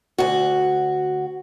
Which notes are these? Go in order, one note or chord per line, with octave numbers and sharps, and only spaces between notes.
D2 F#4